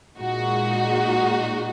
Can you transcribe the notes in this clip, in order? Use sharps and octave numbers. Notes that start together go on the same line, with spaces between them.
A#2 G#3 D#4 F#4